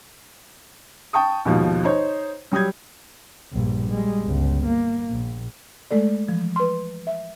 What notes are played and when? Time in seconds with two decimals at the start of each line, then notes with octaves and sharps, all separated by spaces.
1.13 G5 A5 C#6 D#6
1.45 D#2 G#2 B2 F3
1.84 D#4 C5 C#5
2.52 F#3 G3 D#6 G6 G#6
3.53 A#1 G2
3.90 G3 G#3
4.23 G1 C#2
4.65 A#3
5.10 A#1
5.91 G#3 A3 A4 D5
6.29 E3 F3
6.56 B4 C6
7.07 E5